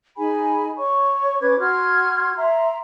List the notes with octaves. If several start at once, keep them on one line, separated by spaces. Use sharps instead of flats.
D#4 G#4 G#5 B5
C#5 C#6
C#4 B4 D6 G#6
F#4 C6 F6 G#6
E5 A#5 C6